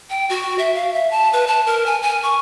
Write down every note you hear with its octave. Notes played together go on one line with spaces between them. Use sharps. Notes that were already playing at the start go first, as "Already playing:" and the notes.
G5
F#4
E5
F5
E5
A5
B4
A5
A#4
G#5
G#5
C#6